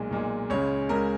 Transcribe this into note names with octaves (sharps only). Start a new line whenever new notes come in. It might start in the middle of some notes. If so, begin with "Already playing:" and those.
Already playing: B1 A#2 G#3
B1 A#2 G#3
C#2 C#3 G#3 C#5
C#2 C#3 G#3 A#4